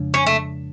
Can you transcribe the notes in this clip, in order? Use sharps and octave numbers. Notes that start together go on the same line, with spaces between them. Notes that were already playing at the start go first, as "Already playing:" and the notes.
Already playing: F2 C#3 F3 G#3 D4
C#4
A3